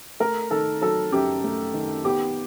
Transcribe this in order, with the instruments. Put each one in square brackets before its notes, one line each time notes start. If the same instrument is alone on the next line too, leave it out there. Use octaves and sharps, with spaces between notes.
[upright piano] A3 [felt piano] A#4
[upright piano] D#3 [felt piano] A4
[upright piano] F#3 [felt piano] A4
[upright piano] F#2 [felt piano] G4
[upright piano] A3
D#3
[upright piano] B3 [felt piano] G4